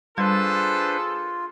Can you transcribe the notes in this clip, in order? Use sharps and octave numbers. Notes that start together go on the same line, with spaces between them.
G3 D4 F4 G#4 A4 B4 C5